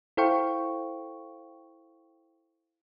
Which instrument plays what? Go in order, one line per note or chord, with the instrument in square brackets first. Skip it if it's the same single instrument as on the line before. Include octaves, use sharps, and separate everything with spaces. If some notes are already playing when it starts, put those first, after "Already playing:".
[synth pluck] E4 A4 C5 F5 G5 C#6